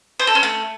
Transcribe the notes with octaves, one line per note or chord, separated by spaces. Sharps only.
C5
A4
C#4
A3